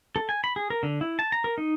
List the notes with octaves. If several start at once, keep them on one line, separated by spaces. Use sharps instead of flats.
A4
G#5
B5
G#4
A#4
D3
E4
A5
A#5
A#4
D#4